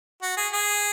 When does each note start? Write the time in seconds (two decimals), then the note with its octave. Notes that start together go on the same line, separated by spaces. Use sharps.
0.22 F#4
0.37 G#4
0.53 G#4